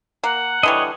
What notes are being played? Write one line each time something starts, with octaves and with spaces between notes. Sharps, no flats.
A#3 F#5
D3 E3 G3 C#5 D#5